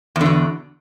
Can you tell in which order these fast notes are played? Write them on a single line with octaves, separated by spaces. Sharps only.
E2 D3 B2